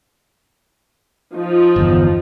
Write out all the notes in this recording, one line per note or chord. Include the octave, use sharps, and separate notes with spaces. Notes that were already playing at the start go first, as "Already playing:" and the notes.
F3 D#4
G1 E2